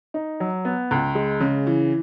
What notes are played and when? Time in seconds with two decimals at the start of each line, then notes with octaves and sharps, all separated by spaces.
0.14 D#4
0.40 F#3
0.65 B3
0.91 C#2
1.15 G#3
1.40 C#3
1.67 E3